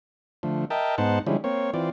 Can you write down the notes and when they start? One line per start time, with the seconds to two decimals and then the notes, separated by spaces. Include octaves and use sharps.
0.43 D3 F3 A3
0.70 A#4 D#5 E5 G5 A5
0.98 G#2 B3 D#4 C5 F#5 A5
1.27 D3 F3 G3 G#3 C#4 E4
1.44 A#3 C4 C#5
1.74 E3 C4 F4 D5